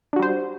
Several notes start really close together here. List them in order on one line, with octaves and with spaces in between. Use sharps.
D4 F#4 G3 C5